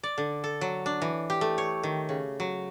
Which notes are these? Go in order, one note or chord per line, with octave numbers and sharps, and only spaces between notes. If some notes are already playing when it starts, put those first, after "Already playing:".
D5
D3
A4
F#3
D4
E3
G4
A3
C#5
D#3
C#3
F#3